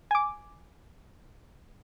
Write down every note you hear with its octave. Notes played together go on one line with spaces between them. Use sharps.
G#5 D6